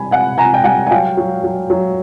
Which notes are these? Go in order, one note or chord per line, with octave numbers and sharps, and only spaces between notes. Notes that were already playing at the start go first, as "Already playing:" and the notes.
Already playing: C3 E3 G3 G#5 B5
C3 F#5 G#5
C3 G#5 A#5
G5
G3 F#5 G#5
G#5
F#3 F5 G5
F#3
F#3
F#3